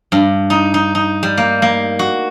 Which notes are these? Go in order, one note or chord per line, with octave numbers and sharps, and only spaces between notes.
G2
D#4
D#4
D#4
G3
A#3
A#3
F#4